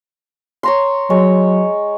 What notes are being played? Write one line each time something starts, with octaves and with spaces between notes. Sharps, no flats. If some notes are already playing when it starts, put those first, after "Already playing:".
C#5 A#5 C6
F#3 G#3 C#5